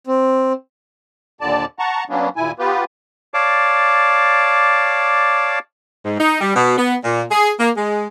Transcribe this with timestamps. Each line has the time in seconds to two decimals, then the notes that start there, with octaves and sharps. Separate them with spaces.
0.07 C4
1.41 D#2 A#2 D3 D5 A5
1.79 F#5 A5 A#5 C#6
2.09 F#3 A#3 B3 C#4 D4
2.36 D#2 A#2 E4 G#5
2.59 B3 F4 G4 B4
3.34 C#5 D5 F5 A5 D6
6.05 G#2
6.19 D#4
6.41 G3
6.56 B2
6.78 B3
7.04 A#2
7.31 G#4
7.60 A#3
7.77 G#3